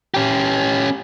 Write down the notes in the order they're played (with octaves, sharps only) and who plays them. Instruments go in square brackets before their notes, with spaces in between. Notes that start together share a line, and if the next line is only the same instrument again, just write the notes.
[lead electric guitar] C#4 G4